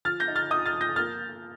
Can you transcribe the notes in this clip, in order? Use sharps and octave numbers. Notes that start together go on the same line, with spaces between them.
F3 F6 A6
G6 A#6
D#4
F6 A6
D#4 D#6 G6
F6 A6
F3
G6 A#6
A#3 F6 A6